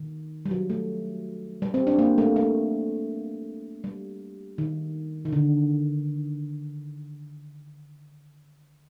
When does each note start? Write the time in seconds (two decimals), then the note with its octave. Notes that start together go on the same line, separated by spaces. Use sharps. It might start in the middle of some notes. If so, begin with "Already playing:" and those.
Already playing: D#3
0.45 G3
0.51 F#3
0.70 A3
1.62 G3
1.74 C4
1.87 D4
1.99 A#3
2.18 A3
2.36 A3
3.84 G3
4.58 D#3
5.25 D#3
5.33 D3